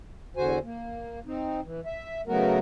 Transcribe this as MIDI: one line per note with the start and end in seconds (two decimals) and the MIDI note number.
0.37 0.59 40
0.37 0.59 50
0.37 0.59 66
0.37 0.59 72
0.37 0.59 80
0.64 1.20 58
1.26 1.61 60
1.26 1.61 63
1.63 1.81 52
1.86 2.21 76
2.27 2.59 49
2.27 2.59 54
2.27 2.59 57
2.27 2.59 59
2.27 2.59 66
2.27 2.59 70